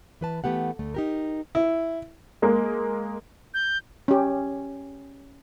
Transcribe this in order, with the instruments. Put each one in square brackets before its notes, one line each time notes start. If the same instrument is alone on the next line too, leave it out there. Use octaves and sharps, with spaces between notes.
[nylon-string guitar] E3 B4 A5
E3 A3 B3 G4 F#5
D2 A3
D#4 G4 A#4
[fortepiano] E4
[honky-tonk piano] G#3 A#3
[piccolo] G6
[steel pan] C#4 G4